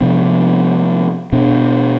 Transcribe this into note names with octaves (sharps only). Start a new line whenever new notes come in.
C3 F3 B3 D4
B2 B3 D4